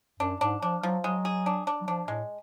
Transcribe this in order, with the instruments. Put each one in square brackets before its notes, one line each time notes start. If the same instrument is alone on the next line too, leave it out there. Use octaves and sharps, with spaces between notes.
[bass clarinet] F#2 [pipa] D4
[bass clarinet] G#2 [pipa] D4
[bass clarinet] F3 [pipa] D4
[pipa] F3 [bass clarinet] F#3
[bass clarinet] F#3 [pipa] G#3
[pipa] G#4
D4
D4
[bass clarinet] F#3
[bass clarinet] F3 [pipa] D4
[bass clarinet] A2 [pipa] G#3